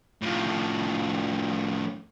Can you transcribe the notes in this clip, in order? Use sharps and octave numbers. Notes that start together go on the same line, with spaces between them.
A2 F3